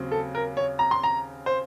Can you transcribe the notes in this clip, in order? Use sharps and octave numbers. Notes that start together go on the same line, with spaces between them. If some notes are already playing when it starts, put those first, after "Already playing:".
Already playing: D#2 C#3 F#3 C4
A4
A#4
C#5
A#5
C6
A#5
C5